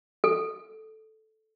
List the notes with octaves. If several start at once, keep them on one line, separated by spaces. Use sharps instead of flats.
A4